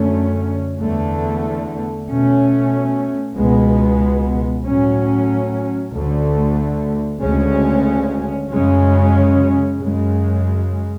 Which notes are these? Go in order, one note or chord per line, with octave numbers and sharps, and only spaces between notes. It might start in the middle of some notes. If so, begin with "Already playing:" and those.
Already playing: F#2 D3 A3 C#4
E2 D3 A3
B2 A3 C#4
C#2 B2 G#3 B3
A2 F#3 C#4
D2 D3 A3
D2 C#3 G#3 C#4
F#2 C#3 G#3 C#4
F#2 C#3 G#3